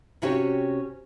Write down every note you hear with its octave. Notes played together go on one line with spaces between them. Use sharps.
C3 C#4 E4 F#4 G4 C#5